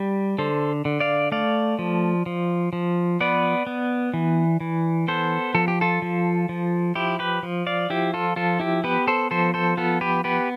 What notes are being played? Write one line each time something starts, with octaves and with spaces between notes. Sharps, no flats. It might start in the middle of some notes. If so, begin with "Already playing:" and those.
Already playing: G3 G4
D3 A4 C5
D3
D5 F5
A3 D5 F5
F3
F3
F3
B3 B4 D5
B3
E3
E3
B3 A4 C5
F3 A4
G4
F4 A4
F3
F3
F3 E4 G4
G4 B4
F3
D5 F5
F3 E4 G4
F4 A4
F3 F4 A4
E4 G4
B3 G4 B4
A4 C5
F3 A4 C5
A4 C5
B3 F4 A4
G4 B4
B3 G4 B4